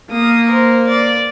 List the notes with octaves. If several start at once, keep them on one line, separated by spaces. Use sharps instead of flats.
A#3 D#6
A#4 C5
D5